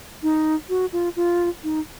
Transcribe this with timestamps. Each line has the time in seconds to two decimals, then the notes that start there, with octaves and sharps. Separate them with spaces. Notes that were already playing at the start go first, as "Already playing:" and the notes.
0.23 D#4
0.69 F#4
0.93 F4
1.16 F4
1.63 D#4